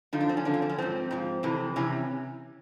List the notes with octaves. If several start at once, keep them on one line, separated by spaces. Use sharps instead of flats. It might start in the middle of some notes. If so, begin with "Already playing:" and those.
F#2 D3 F3 D#4
D4
C4
C#4
F#2 D3 F3 D4
C#4
C4
C#4
G#2 F3 C4
G#2 F3
F2 C3 E3
C3 E3 C#4